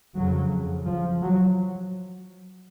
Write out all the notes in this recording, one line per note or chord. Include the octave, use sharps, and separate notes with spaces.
F2 C#3 F#3
F3
F#3